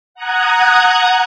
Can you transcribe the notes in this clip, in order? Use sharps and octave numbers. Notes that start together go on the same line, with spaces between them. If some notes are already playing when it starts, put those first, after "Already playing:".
F#5 A#5 D#6 F#6 G#6